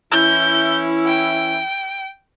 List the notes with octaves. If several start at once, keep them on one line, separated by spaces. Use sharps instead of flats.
E3 C#4 E4 G6
G5